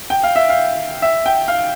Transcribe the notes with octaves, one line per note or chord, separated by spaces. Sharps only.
G5
F5
E5
F5
E5
G5
F5